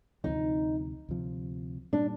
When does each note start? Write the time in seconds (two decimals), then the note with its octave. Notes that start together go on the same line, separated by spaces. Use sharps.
0.24 D2 C3 F3 D#4
1.09 D2 C3 F3
1.93 A#2 G3 D4